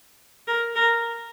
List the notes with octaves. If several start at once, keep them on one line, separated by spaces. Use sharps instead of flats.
A#4
A#4